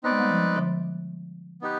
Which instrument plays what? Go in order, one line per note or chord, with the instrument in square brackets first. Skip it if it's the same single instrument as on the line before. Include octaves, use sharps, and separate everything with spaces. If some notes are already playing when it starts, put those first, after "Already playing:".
[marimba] B3 [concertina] C4 D#4 B4 D5
[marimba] G#3
G3 B3
F3 G#3
D3 F3
[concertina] B3 D#4 G4 B4